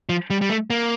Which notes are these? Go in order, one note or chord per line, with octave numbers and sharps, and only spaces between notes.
F3
G3
G3
A3
A#3